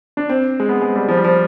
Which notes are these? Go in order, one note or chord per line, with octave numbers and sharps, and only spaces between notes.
D4
C4
G#3
B3
G#3
G3
F3
G3
F3